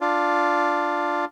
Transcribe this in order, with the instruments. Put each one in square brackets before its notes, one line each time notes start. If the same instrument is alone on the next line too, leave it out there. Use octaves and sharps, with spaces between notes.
[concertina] D4 F4